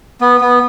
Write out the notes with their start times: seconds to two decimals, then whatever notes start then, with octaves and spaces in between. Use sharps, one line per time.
0.21 B3
0.41 B3